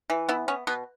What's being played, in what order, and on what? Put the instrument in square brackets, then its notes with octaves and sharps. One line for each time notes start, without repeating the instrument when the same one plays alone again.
[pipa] E3
B3 E4
B3 C#4
B2 B3